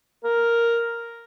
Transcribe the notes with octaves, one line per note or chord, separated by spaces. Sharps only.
A#4